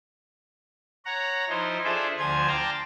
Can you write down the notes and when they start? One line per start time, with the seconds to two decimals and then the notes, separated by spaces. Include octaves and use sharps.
1.06 C#5 F#5 A#5
1.49 F3 D#4 E4 C5
1.84 D4 F4 G#4 A4 C5 E5
2.18 D2 F3 F4 C5 G#5 G#6
2.48 D5 F5 G5 A5 A#5 C6